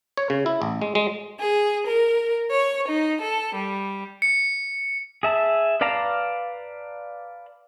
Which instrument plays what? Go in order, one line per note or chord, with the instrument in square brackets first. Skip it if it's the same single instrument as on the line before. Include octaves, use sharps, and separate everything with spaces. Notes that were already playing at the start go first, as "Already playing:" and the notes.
[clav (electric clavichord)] C#5
C#3
E4
A1
G#3
G#3
[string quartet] G#4
A#4
C#5
D#4
A4
G3
[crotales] C#7
[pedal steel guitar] G#4 E5 A5
B4 D5 F5 A5 A#5